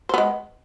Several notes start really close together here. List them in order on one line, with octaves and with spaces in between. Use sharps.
C5 B3 G#3